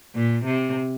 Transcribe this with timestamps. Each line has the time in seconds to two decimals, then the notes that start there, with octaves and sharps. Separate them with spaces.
0.15 A#2
0.45 C3